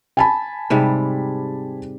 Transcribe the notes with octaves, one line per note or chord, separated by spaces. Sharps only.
G#5 A5 B5
G#2 C3 G3